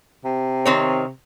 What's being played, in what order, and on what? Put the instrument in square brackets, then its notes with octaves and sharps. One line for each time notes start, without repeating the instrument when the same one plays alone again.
[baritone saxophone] C3
[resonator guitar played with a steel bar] D#3 C4 C#5